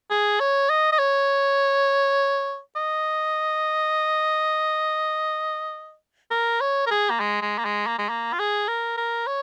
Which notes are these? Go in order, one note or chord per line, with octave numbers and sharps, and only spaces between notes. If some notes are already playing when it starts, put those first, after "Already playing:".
G#4
C#5
D#5
D#5
C#5
D#5
A#4
C#5
A#4
G#4
A#3
G#3
G#3
A#3
G#3
A#3
G#3
A#3
F4
G#4
A#4
A#4
C#5